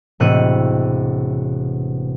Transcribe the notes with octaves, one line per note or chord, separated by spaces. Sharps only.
E1 A2 C3 F#6 C#7 D#7